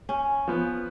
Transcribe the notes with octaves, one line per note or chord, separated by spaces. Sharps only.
C#4
F3 B3